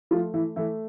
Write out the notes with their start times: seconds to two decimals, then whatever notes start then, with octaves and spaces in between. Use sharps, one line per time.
0.11 F3 A3 F4
0.34 E3 E4
0.56 E3 A3 E4